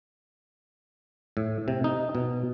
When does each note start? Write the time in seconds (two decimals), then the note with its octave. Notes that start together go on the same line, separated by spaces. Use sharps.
1.37 A2
1.68 C3
1.84 D#4
2.15 B2